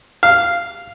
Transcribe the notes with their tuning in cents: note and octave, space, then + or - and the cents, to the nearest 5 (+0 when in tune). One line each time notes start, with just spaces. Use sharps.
F5 -10